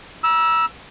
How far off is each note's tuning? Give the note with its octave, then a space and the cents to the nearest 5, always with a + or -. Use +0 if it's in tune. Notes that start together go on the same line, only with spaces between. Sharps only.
A#5 +45 E6 +0